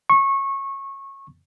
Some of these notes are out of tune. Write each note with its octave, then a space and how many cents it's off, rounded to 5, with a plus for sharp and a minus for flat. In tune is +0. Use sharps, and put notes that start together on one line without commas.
C#6 -20